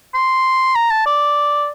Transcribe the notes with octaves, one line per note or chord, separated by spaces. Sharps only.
C6
A#5
A5
D5